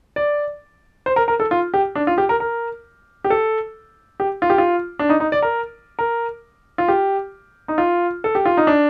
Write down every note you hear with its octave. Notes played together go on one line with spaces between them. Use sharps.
D5
C5
A#4
A#4
A4
F4
G4
D4
F4
G4
A#4
A#4
G4
A4
G4
F4
G4
F4
D4
D#4
D#4
D5
A#4
A#4
F4
G4
D#4
F4
A4
G4
F4
D#4
D4